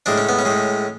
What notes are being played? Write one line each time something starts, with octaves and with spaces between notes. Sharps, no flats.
A2 G#3 D4
C#4
B3
C#4
A2 G#3